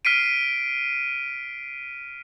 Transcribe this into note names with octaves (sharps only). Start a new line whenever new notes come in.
F6 B6 C7 D7 D#7